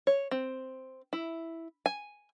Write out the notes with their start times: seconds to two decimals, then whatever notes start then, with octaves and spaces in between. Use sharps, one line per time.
0.07 C#5
0.31 C4
1.13 E4
1.86 G#5